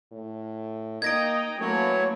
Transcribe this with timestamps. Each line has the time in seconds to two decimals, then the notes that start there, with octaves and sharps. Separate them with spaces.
0.12 A2
1.02 A#3 D#4 D#5 G5 G#6 A#6 D7
1.61 E3 F#3 A3 A#3 C#4 C#5